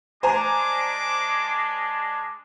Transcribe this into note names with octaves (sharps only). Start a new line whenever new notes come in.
G#3 D4 C5 G#5 A#5 D6